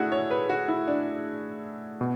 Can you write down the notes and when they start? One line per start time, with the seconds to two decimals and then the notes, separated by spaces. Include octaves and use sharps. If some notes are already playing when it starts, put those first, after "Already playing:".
Already playing: A3 D4 E4 F#4 G#4
0.12 C#5
0.31 B4
0.49 F#4
0.68 E4
0.88 D4
2.01 B2